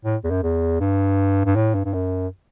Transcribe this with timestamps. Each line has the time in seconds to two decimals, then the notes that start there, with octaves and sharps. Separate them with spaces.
0.05 A2
0.24 E2
0.31 F#2
0.43 E2
0.80 G2
1.45 G2
1.56 A2
1.75 G2
1.85 G2
1.94 F#2